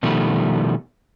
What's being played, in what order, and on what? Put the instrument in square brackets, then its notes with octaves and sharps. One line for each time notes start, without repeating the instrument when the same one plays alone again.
[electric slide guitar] B2 D#3 F3 G3 A3